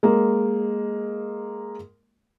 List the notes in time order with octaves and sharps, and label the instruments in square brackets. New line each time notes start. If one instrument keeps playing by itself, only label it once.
[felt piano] G#3 A#3